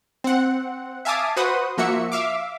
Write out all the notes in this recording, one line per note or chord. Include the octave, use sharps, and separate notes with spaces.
C4 F#5
E5 F5 G#5 A5 D6 D#6
F#4 B4 C5 F#5 D#6
F3 A#3 F#4 E5 C#7
E5 F5 D6